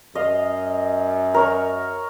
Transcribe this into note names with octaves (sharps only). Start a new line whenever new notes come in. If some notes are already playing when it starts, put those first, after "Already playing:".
F#2 D#5 F5
A#4 C#5